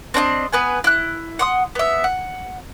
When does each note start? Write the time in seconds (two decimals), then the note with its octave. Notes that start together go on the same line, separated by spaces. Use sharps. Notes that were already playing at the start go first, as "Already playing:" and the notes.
0.14 C4 D4 D5 D#5
0.53 B3 B4 G#5
0.84 E4 F#6
1.39 F#5 C6 D#6
1.75 B3 E5
2.04 F#5